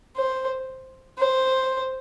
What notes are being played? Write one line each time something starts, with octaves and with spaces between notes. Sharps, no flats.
C5
C5